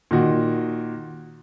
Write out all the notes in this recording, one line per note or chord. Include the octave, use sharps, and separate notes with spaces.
A#2 D#3 F#4